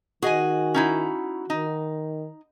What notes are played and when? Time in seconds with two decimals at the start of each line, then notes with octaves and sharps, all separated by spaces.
0.22 D#3 F#4 G#4 D#5 G#5
0.74 C#4 D#4 E4
1.50 D#3 D#4